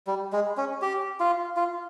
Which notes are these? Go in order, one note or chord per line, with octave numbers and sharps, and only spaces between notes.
G3
G#3
C#4
G4
F4
F4